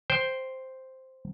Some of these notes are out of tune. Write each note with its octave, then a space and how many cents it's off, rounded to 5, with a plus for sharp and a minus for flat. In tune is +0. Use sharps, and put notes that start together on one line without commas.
C5 +0 G5 +0